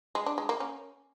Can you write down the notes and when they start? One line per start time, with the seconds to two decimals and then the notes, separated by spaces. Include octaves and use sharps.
0.15 G#3
0.26 D4
0.38 G#3
0.49 A#3
0.60 C#4